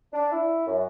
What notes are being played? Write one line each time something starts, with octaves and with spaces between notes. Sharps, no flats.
D4
E4
F#2